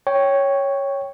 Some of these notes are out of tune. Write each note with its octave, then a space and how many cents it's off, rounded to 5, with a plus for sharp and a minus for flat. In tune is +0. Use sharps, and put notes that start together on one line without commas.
C#5 +0 G5 +0